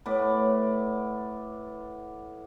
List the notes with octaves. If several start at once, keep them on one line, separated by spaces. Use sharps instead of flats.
A2 B3 D5 B5